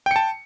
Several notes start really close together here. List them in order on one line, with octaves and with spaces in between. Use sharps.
G5 C#7 A5